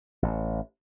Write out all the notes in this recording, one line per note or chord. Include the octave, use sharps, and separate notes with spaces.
A1